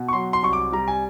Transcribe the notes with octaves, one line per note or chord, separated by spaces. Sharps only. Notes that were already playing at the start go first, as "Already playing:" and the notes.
Already playing: B2
C#6
F#3 C6
C6
C2 C#6
D6
G3 A#5
G#5